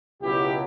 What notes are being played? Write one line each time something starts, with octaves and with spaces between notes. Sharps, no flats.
C#2 B2 F#3 E4 G4